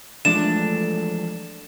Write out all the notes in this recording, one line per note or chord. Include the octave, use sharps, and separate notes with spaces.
E3 F3 G#3 A3 D4 E7